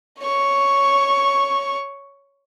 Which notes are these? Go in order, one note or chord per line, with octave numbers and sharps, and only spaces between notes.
C#5 C#6